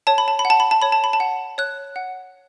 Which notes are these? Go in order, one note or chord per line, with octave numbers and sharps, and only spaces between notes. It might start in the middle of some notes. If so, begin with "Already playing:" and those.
C#5 A5
B5
A5
B5
F#5
A5
B5
A5
C#5 B5
A5
B5
A5
F#5
C#5 F#6
F#5